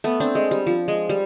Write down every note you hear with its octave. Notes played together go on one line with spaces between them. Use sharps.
A3 B3
C4 D4
G#3
G3
F3
G#3
G3